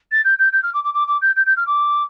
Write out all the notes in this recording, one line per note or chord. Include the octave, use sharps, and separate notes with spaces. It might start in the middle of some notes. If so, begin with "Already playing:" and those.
A6
G6
G6
G6
F6
D6
D6
D6
D6
G6
G6
G6
F6
D6